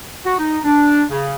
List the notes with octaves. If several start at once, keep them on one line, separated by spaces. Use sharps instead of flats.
F#4
D#4
D4
C#3